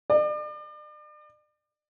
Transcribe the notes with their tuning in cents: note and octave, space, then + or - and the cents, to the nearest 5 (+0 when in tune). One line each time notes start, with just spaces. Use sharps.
D5 +40